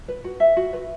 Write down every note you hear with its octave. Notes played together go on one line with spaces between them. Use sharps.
B4
F#4
E5
F#4
B4